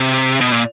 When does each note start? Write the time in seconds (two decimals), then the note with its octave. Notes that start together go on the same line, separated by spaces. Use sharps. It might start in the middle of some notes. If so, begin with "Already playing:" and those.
Already playing: C3
0.41 B2
0.52 A#2